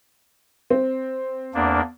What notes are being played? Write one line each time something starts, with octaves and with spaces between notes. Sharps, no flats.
C4
E2 A#3 D4